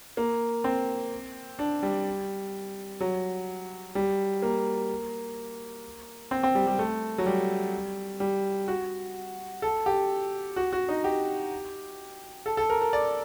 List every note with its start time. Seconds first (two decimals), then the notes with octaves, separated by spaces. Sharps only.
0.17 A#3
0.64 C4
1.59 D4
1.83 G3
3.00 F#3
3.95 G3
4.42 A#3
6.31 C4
6.43 C4
6.55 G3
6.67 G3
6.79 A3
7.18 F#3
7.26 G3
8.20 G3
8.68 F#4
9.62 A4
9.86 G4
10.56 F#4
10.73 F#4
10.89 D#4
11.04 G4
12.46 A4
12.57 A4
12.70 A#4
12.81 A#4
12.93 D5